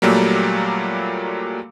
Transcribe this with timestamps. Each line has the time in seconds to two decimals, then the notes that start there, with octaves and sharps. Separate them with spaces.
0.02 A#2 F#3 G3 A3 A#3